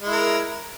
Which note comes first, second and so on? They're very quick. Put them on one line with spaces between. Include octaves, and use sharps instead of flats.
G#3 E4 A#4